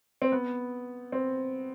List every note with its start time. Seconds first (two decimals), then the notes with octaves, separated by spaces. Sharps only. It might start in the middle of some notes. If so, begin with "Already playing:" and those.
0.22 C4
0.32 B3
1.12 C4